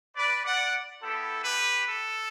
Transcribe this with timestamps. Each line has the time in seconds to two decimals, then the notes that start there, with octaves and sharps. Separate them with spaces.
0.16 B4 D5
0.44 D5 F#5
1.01 B3 E4 G4 A4
1.44 G4 B4
1.87 A4